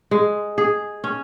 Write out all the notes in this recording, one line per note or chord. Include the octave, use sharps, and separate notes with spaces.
G#3
G#4
C#4